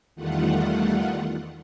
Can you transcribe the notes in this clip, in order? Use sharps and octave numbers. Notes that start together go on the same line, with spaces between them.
E2 D#3 G3 A3 F4 F#5